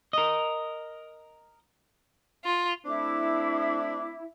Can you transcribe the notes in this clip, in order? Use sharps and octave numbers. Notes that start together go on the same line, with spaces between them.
A#4 D#5
F4
A3 C4 D4 E4 D6